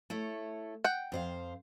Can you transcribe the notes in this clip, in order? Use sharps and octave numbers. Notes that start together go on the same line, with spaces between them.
A3 E4 C#5
F#5 G5
F2 C5 F5